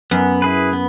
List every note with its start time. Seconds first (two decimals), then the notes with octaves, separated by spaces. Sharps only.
0.11 F#2 B3
0.42 E4 G#4 B4
0.73 B3